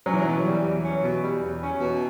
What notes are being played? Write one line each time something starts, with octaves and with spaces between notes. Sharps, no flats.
F#3 C#4
E3
B2 F#3
G3
E2
C#4
B2
G3
E2
C#4
B2